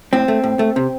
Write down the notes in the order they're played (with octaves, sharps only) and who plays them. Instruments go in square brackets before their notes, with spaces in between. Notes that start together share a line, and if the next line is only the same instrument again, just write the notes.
[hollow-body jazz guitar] A2 C4
A3
A2
A3
C3